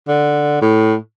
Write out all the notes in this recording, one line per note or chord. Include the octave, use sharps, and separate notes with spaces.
D3
A2